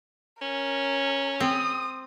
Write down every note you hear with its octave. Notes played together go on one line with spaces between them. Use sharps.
C#4 A#4
C4 D#6